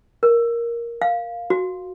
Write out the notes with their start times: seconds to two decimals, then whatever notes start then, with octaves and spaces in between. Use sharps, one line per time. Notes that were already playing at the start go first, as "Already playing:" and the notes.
0.23 A#4
1.02 F5
1.50 F#4